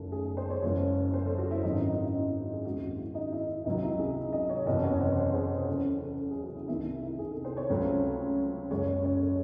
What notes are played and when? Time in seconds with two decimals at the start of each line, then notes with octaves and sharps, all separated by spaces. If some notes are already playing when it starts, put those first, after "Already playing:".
Already playing: F#1 F#2 D#3 A3 A4
0.12 G#4
0.25 G#4
0.37 C5
0.50 C#5
0.62 F#1 F#2 E3 G#3
1.14 C5
1.26 A4
1.38 F#4
1.51 E4
1.63 G#1 F#2 C#3 F#3 C4 D#4
1.76 E4
1.89 D#4
2.02 E4
2.14 E4
2.53 G#4
2.65 D#2 C#3 G#3 C4 F#4
2.82 F#4
2.98 E4
3.15 D#4
3.33 E4
3.49 E4
3.65 C#2 C3 D#3 F#3 D#4
3.83 E4
3.99 G#4
4.33 D#5
4.49 C#5
4.66 F#1 E2 C3 D#5
4.84 C#5
5.00 C5
5.18 C5
5.33 G#4
5.68 F#2 C#3 E3 A4
6.02 A4
6.18 A4
6.31 G#4
6.43 F#4
6.55 E4
6.68 C2 C3 D#3 E4
7.02 E4
7.19 G#4
7.31 A4
7.45 C5
7.57 C#5
7.69 C#2 C#3 F#3 A3 C4
8.70 F#1 F#2 C#3 G#3 C#5
8.88 C#5
9.05 C#5
9.21 A4